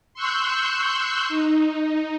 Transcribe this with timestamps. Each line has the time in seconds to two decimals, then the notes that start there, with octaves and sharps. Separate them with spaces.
0.14 C6 C#6 E6 F#6 G6
1.29 D#4